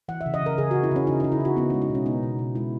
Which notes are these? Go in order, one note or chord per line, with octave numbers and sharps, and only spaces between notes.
E3 F#5
E5
C#3
D#5
C#3 A#4
C#3 G#4
C#3 F#4
E4
C#3 C#4
C#3 D#4
C#3 D#4
E4
C#3 F#4
B3 D#4
G#3 C#4
D#4
B2 C#4
B3 D#4
B2
B2
G#3 E4